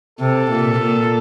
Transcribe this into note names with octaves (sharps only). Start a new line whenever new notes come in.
C3 A4
A#2
A#2